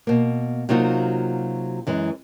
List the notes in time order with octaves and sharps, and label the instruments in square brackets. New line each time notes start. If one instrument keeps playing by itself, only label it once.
[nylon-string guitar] B2 A#3
C3 F#3 A#3 D#4 F4 F#4
F#2 E3 G#3